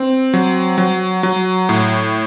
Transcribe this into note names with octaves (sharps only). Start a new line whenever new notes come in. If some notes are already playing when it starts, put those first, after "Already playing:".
Already playing: C4
F#3
F#3
F#3
A2